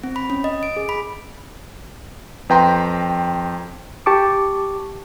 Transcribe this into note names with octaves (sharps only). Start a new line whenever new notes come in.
C4
B5
C#4
D#5
D7
G#4
B5
F2 B4 G5 A#5 C6
G4 A5 C#6 D6